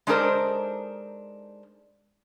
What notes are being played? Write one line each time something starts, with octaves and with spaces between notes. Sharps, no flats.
G#3 D4 D#4 A4 A#4 C5